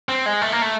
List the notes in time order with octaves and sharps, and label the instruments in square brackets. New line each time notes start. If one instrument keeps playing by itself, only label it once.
[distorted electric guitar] C4
G#3
A3
A#3
A3